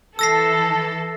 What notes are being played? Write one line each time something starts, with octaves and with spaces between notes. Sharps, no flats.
E3 A4 E6 A#6 C7